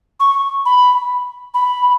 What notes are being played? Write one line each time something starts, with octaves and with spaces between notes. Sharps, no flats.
C#6
B5
B5